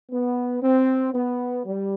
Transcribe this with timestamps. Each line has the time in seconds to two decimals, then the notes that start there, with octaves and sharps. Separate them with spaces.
0.11 B3
0.62 C4
1.14 B3
1.66 G3